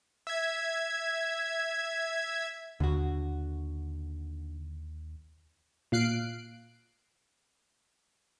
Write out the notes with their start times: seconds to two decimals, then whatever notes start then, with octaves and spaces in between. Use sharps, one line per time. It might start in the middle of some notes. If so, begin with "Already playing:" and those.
0.27 E5 G#6
2.80 D#2 D3 F#4
5.92 A#2 F5 F#6 C7 D7